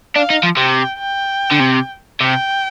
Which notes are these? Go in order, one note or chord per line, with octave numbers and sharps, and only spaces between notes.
D4 F5
D#4
F3
C3 G5
G5
D3
C3
C3 G5